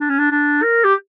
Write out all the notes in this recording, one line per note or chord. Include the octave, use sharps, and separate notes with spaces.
D4
C#4
D4
D4
A#4
G4